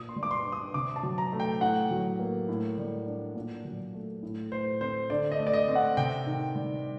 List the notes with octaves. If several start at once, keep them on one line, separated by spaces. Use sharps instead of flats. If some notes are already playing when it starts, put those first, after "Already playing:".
Already playing: A#2 D#6
C6
G3
D6
C6
D4
D#6
C3 D6
A5
F#3
A#5
A3
G5
A2 F#5
F#3
A#3
A2
G3
D4
A#2
F#3
A3
A2
A3 C5
C4 C5
D3 D5
D#5
A3
D5
D#5
C4
F#5
C3 G5
D#3
G3